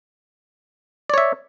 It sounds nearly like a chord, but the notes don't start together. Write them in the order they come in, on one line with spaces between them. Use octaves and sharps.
D5 C#5 E5